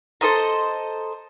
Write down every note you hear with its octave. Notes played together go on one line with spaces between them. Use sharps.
A4 C5 D#5 A#5